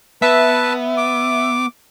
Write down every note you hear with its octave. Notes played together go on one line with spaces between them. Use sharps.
B3 B4 E5 A5
D6